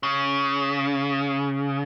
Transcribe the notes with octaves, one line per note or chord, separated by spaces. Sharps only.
C#3